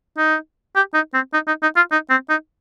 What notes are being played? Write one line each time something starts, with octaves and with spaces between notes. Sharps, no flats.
D#4
G4
D#4
C4
D#4
D#4
D#4
F4
D#4
C4
D#4